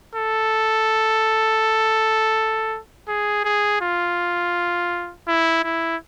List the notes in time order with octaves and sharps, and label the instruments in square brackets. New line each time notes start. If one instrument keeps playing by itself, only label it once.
[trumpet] A4
G#4
G#4
F4
E4
E4